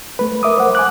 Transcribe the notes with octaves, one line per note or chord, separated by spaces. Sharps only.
A3 B4
A#4 E5 D6 D#6
C5 F#5
G#5 D6 F#6